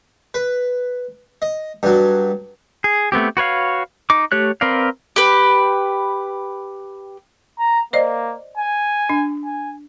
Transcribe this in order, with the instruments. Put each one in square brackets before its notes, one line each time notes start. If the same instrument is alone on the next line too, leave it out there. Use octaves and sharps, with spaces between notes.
[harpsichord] B4
D#5
G2 F#3
[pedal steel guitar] G#4
A3 B3 C4 G4
F#4 B4 C#5 F5
D#4 D6
A3 G4 C#5 F#6
C4 A#4 B4 D5 F5
[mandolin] G4 B4
[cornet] A#5
[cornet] A#3 [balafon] C5 D5 D#5
[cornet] G#5
[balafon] D4
[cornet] G#5